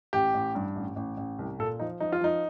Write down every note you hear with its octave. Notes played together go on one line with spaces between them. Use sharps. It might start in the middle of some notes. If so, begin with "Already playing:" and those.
A1 G4
A1
G2
A1
A1
A1
C2
A#2 A4
F3 D#4
F3 D#4
F4
F3 D#4